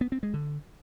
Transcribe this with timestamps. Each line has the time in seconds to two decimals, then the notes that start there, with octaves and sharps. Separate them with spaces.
0.01 B3
0.12 C4
0.23 G#3
0.34 D3